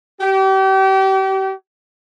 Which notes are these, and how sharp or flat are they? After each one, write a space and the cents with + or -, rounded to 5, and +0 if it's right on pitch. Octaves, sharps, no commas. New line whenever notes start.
G4 -35